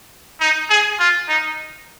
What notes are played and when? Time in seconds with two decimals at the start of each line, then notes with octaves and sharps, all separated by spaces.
0.40 D#4
0.70 G#4
0.99 F4
1.28 D#4